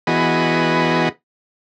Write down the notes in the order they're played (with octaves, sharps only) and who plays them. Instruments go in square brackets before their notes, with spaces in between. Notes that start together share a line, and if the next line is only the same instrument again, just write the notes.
[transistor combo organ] E3 B3 F#4 G#4 D#5 B5